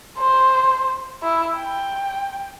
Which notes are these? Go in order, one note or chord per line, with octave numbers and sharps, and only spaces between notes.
C5
E4
G5